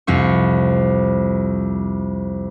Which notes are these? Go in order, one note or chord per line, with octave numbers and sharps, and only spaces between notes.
C2 F2 C#6